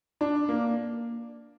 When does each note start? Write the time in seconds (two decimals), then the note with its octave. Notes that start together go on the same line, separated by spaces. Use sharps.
0.21 D4
0.49 A#3